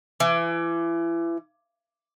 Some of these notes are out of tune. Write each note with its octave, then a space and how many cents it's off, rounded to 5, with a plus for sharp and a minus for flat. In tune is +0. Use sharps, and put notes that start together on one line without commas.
E3 +30